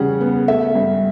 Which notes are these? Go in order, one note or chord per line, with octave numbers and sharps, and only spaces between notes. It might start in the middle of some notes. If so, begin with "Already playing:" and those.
Already playing: C#3 E3 G3 F#5
B3
A3 E5
G2